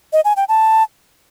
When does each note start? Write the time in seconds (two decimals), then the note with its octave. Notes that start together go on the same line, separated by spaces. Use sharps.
0.13 D#5
0.25 G#5
0.37 G5
0.48 A5